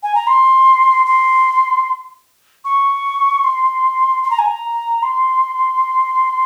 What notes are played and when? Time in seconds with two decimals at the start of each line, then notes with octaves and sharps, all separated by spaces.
0.03 G#5
0.15 A#5
0.27 C6
1.06 C6
2.65 C#6
3.44 C6
4.23 C6
4.31 A#5
4.39 G#5
4.46 A#5
5.03 C6